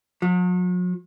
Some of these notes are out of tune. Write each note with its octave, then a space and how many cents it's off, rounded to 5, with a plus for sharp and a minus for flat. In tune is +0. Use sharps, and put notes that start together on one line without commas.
F#3 -45